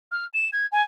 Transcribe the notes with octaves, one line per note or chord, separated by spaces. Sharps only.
F6
E7
G#6
G#5